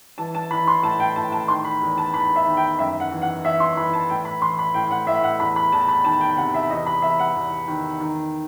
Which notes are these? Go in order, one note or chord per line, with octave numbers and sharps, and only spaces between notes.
E3 A5
A5
E3 B5
C6
A2 A5
G5
A2 A5
A5
D#3 C6
B5
E2
A5
E2 B5
E5
D#3
G5
F#2 E5
F#5
E3
F#5
E3 E5
C6
E3 B5
A5
A2 G5
B5
E3 C6
B5
A2 G5
F#5
A2 E5
F#5
E2 B5
B5
E2 A5
B5
D#3 A5
G5
C3 F#5
E5
E2 D#5
B5
E2 E5
F#5
E2
D#3
D#3